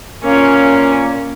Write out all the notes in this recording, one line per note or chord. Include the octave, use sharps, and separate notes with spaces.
A#2 A#3 C#4